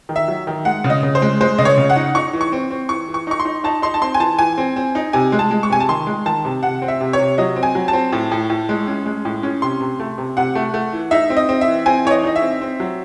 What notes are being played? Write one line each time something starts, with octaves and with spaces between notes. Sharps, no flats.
D#3
E5
F#3
D#3
G#3 F#5
C#3
D#5
C#3
C5
G#3
G#3 C5
C#3 D#5
C#5
C#3
F#5
D#4
D#4 C#6
E3
C#6
C4
C4
E3 C#6
E3
C#6
D#4 C#6
C6
D#4
D#4 A5
D#4 C6
A5
C4 C6
G#5
E3 A5
E3 G#5
C4
C4
D#4
C3 G#5
G#3
A5
G#3
C#6
C3 G#5
A5
D#3 C6
G#3
D#3 A5
C3
C3 F#5
C4
E5
C3
C#5
C3
F#3 D#5
C4
G#5
F#3
A5
C4
A2
A2
A2
G#3
C#4
G#3
A2
C#4
C3 C6
C3
A3
C3
C3 F#5
A3
A3
E3
D#4 E5
C4
D#5
C4
E5
E3
C4 G#5
E3 C#5
D#5
D#4 D#5
E5
C4
C4
F#3